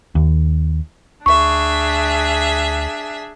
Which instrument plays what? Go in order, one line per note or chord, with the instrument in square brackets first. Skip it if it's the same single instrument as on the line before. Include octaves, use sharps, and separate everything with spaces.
[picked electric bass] D#2
[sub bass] D2 [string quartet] D4 G#4 E5 [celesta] C#6